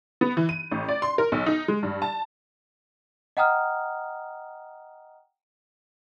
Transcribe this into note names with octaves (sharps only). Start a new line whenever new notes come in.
B3
E3
D#7
A1
D5
C6
A#4
B1
D#4
G#3
G2
A5
D#5 F#5 G5 A#5 D#6 F6